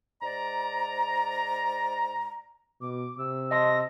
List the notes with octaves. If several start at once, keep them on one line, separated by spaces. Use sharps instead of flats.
G#2 D5 A#5
B2 D6
C3 E6
D#5 A5 C6 A#6